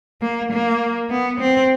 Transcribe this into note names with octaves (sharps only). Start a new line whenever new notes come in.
A#3
A#3
B3
C4